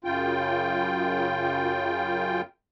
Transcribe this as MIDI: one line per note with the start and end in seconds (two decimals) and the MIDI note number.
0.04 2.41 42
0.04 2.41 49
0.04 2.41 65
0.04 2.41 79